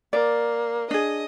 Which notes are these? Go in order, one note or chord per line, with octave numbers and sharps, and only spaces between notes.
A#3 D5
D4 G#4 D#5